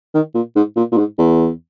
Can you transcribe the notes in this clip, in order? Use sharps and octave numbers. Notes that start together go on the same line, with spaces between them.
D#3
A#2
G#2
A#2
A#2
G#2
E2